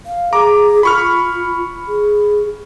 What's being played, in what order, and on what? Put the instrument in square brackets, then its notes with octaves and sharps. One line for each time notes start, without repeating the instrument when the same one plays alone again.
[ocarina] F5
[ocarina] G#4 [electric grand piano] A#5 D6
[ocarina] F4 [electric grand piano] B5 C#6 F6
[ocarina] G#4